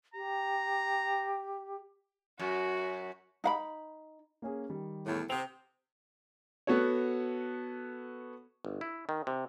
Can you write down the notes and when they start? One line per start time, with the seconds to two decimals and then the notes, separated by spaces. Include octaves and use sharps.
0.14 G4 A#5
2.39 F#2 F#4
3.44 D#4 F5 B5
4.42 A#3 C#4 G#4
4.69 D#3 G3
5.06 E2 A2
5.30 C3 C4 G5 D#6 F7
6.67 B3 F#4 A4 C#5
8.65 G1
8.81 E4
9.09 D#3
9.27 C3